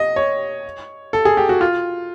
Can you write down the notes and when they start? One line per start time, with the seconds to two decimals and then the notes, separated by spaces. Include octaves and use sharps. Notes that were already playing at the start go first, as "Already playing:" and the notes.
Already playing: D#5
0.16 C#5
1.13 A4
1.25 G#4
1.37 G4
1.49 F#4
1.61 F4